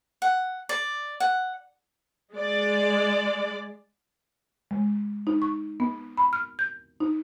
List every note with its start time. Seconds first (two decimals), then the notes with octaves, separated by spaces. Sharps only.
0.22 F#5
0.69 D5
1.20 F#5
2.32 G#3 D5
4.71 G#3
5.27 D#4
5.42 C#6
5.80 B3
6.17 B5
6.33 F6
6.59 G6
7.00 D#4